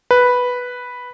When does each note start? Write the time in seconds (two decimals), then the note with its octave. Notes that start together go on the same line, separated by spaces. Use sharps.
0.11 B4